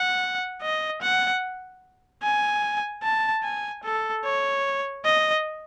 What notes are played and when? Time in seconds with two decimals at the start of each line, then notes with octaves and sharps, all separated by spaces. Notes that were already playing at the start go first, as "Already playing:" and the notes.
Already playing: F#5
0.62 D#5
1.02 F#5
2.23 G#5
3.03 A5
3.43 G#5
3.84 A4
4.25 C#5
5.05 D#5